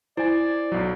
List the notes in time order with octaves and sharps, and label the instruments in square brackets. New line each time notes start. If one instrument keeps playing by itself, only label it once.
[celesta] E4 [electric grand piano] C5 G#5 [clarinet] D5
[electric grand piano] B1 F#3